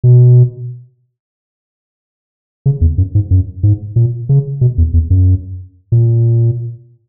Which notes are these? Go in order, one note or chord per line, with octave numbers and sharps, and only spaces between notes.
B2
C#3
E2
F#2
G#2
F#2
G#2
A#2
C#3
B2
E2
E2
F#2
A#2